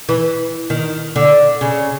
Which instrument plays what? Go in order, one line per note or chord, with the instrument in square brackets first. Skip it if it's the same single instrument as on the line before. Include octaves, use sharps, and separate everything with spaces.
[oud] E3
D#3
D3
C#3